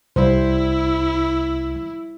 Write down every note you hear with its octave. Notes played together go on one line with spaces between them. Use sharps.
C2 G3 E4 C5